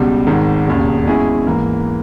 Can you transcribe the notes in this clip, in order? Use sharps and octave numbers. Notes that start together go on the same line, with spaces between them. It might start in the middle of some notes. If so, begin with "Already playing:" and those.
Already playing: C#2 B2 G3
G#1 G#2 D#3
E1 D#2 C#3
B2 G#3 C#4 E4 G#4
G#2 E3 A#3